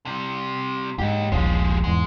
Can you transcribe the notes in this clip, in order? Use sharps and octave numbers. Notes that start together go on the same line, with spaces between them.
C3 G3
G#2 G4 D#5
D#1 A#1 F3 G#3
E2 G#2 G#3